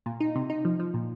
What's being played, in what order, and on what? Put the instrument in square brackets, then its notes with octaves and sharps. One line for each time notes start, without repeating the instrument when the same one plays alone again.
[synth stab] A#2
D#4
C3
D#4
F3
F3
A#2